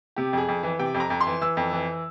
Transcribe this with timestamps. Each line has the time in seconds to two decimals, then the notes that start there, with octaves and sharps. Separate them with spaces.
0.16 C3 G4
0.33 F2 G#4
0.48 F2
0.63 E3
0.79 C3 G5
0.94 F2
1.00 A#5
1.10 F2
1.21 C6
1.27 E3
1.41 E3 E6
1.57 F2
1.73 E3